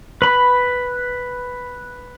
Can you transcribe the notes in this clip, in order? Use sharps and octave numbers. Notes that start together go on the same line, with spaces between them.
B4 B5